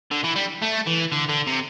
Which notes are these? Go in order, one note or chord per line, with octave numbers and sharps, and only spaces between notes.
D3
E3
G3
A3
E3
D3
D3
C3